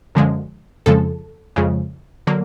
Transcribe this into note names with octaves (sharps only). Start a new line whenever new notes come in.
F#2 D3 F3 G#3
F2 C#3 F3 G#3 A4
F2 C#3 F3 G#3
D3 F#3 A#3